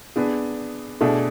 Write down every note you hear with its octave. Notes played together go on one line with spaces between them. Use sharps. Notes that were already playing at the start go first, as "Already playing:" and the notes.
B3 D4 G#4
B2 A3 D4 G#4